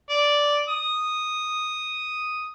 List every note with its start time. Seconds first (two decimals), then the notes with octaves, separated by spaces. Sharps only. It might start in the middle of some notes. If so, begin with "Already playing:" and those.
0.10 D5
0.69 D#6